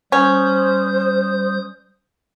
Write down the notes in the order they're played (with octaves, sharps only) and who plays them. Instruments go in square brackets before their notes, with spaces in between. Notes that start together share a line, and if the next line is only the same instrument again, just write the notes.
[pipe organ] G3 D#6 G6 [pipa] C#4 [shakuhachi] C5